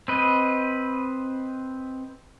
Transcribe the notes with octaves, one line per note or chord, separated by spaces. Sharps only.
C4 B4 D#5